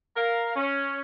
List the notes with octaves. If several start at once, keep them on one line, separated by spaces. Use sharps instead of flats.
A#4 F5
C#4